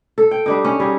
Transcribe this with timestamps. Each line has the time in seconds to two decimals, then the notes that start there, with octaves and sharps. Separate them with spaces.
0.18 A4
0.31 G5
0.46 G3 D4 D#4
0.64 C#4
0.80 G3 G#4 D#5